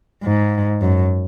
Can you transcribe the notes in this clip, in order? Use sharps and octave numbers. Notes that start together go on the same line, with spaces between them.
G#2
F#2